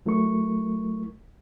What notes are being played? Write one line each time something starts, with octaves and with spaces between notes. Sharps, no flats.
C#2 F#3 A3 E4 A#4 C#6